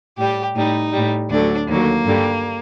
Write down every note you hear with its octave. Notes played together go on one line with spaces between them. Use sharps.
A2 G3 G4
A2 G3 D#4
A2 G3
D2 D3 F#3 D4
D#2 D3 F#3 A#3
G2 D3 G3